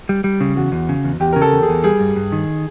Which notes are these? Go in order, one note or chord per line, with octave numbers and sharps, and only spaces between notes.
G3
G3
C#3
E2 F#4
E2
C#3
E2
E2 G4
C#3 A#4
A4
E2
G#4
E2
G3 G#4
G2
G2
D#3